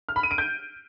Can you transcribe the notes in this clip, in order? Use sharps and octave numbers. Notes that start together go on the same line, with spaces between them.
F6
B5
D#7
D7
G6